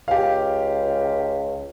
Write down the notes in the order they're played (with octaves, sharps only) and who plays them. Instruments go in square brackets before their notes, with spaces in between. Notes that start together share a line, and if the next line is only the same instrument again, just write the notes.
[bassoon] C#2 [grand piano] G4 F5